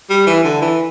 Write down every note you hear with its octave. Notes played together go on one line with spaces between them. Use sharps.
G3
E3
D3
E3